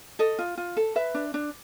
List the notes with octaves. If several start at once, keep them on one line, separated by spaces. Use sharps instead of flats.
A4 D#5
F4
F4
A4
B4 E5
D4
D4